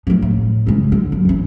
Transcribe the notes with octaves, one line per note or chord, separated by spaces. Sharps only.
F3 A3
A2
C#3 G#3
D3
F#3
E3 C#4